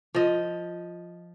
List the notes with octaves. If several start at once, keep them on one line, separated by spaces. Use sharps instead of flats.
F3 D#5